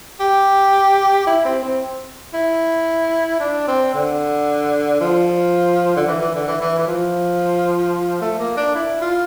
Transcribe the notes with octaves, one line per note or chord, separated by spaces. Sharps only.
G4
E4
C4
C4
E4
D4
C4
D3
F3
D3
E3
E3
D3
E3
E3
E3
F3
A3
A#3
D4
E4
F4